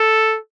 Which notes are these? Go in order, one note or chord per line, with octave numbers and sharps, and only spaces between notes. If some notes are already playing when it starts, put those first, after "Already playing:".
Already playing: A4